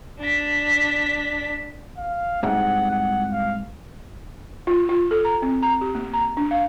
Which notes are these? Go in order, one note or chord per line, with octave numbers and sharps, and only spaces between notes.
D4 B6
F5
C2 G#2 F#5
F#5
F5
F4
F4
A4
A#5
C4
A#5
G4
A#3
A#5
D4
F5